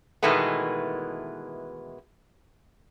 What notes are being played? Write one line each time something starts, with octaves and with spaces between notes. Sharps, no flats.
B2 D#3 E3 G#3 A3 B3